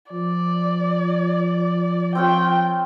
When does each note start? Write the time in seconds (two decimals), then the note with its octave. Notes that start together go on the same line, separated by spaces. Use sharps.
0.12 F3 D5
2.15 C4 F4 C#5 G5